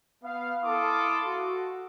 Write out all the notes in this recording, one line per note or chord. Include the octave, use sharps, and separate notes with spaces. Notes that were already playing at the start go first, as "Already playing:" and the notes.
B3 F5
E4 A4 F5 C6 D6 D#6
F#4